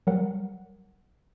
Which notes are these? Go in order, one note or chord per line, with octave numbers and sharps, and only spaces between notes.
F#3 G3 A#4 F#5